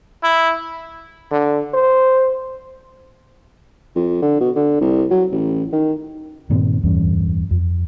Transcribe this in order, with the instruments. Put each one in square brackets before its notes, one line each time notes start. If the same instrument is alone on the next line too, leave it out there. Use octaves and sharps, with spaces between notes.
[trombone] E4
D3
C5
[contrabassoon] F2
D3
B2
D3
C2
F#3
A1
D#3
[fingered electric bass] G2 A#2 D#3 C4
D1 E2 G2 C#4
F2